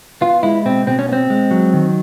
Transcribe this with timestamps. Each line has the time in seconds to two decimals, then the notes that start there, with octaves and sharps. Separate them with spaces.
0.21 B3 F4
0.43 G#3 E4
0.65 B2 C4
0.87 B2 C4
0.99 C#4
1.08 B3
1.13 C4
1.30 G#3
1.51 F#3
1.74 D#3